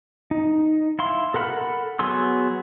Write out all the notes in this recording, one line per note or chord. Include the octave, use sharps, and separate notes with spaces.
D#4
E4 F5 C6
A4 A#4 F#5 B5 F6
F#3 B3 G#4 C6 E6